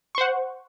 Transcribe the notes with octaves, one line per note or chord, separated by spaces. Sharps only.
C5 F#5 C#6